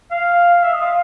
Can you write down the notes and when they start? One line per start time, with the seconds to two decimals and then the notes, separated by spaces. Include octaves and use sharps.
0.11 F5
0.63 E5
0.72 D#5
0.81 F5